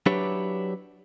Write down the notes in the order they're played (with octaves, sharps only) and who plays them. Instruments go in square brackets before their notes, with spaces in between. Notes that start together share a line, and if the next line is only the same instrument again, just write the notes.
[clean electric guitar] F#3 D4 E4 G4 B4 C#5